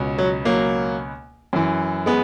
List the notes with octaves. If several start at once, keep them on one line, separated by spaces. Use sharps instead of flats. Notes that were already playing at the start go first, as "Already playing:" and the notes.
Already playing: C#2 B2
F#3
F#3 A#3
F#2 E3
G#3 B3